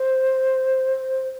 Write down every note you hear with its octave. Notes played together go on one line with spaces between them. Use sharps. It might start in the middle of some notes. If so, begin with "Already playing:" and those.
Already playing: C5